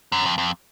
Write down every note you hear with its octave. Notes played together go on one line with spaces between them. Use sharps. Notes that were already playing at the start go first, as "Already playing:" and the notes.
F#2
F2
F2